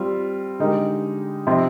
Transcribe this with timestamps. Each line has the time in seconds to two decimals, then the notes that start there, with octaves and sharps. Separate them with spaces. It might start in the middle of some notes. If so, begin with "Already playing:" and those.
Already playing: G3 C4 F4
0.59 D3 G#3 D#4 G4 A#4
1.47 C3 F3 C4 D#4